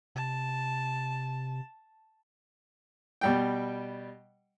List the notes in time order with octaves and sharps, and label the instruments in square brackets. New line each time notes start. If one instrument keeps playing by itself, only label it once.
[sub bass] C3 [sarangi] A5
[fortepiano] B2 G3 G5